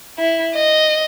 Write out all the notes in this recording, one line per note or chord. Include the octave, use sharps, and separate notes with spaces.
E4
D#5